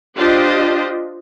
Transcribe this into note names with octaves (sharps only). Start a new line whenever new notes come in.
D4 F4 G4 C5 D#5